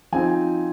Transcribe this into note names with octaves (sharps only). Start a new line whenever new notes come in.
F3 C4 D#4 G#5